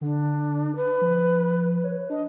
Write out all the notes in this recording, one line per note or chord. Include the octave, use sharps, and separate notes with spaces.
D3 D4
B4
F3
C#5
D4 D#5